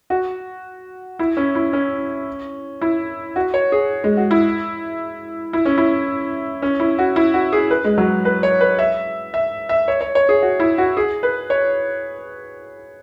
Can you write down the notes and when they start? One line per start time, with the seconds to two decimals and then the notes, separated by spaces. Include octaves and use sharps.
0.10 F#4
1.19 E4
1.37 C#4
1.55 E4
1.73 C#4
2.81 E4
3.36 F#4
3.54 C#5
3.72 G#4
4.04 G#3
4.17 F#4
4.31 E4
5.53 E4
5.66 C#4
5.78 E4
6.62 C#4
6.80 E4
6.99 F#4
7.16 E4
7.34 F#4
7.52 G#4
7.71 B4
7.84 G#3
7.98 F#3
8.25 B4
8.43 C#5
8.61 B4
8.79 E5
9.34 E5
9.69 E5
9.88 C#5
10.01 C#5
10.15 C#5
10.29 G#4
10.42 F#4
10.60 E4
10.78 F#4
10.97 G#4
11.23 B4
11.50 C#5